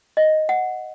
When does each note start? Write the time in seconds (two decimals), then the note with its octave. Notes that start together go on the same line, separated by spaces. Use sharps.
0.17 D#5
0.49 F#5